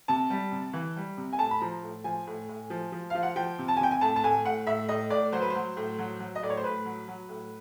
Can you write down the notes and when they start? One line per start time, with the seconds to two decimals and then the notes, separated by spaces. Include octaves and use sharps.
0.08 C3 A5
0.30 G3
0.52 C3
0.73 E3
0.96 G3
1.17 C3
1.33 G#5
1.39 A2 A5
1.51 B5
1.61 F3 A#5
1.83 A2
2.04 F3 G#5
2.27 A2
2.49 A2
2.70 F3
2.92 F3
3.10 F3 F5
3.23 F#5
3.36 F3 G5
3.59 C3
3.68 A5
3.77 G#5
3.80 C3 G5
3.91 G#5
4.01 A2 A5
4.16 A5
4.24 A2 G#5
4.45 A2 F#5
4.67 A2 E5
4.89 A2 D#5
5.10 A2 D5
5.32 F#3 C5
5.42 B4
5.50 C5
5.55 F#3
5.77 A2
5.99 F#3
6.20 F#3
6.35 D#5
6.43 A2 D5
6.50 C#5
6.57 C5
6.63 A2 B4
6.85 F#3
7.08 F#3
7.29 A2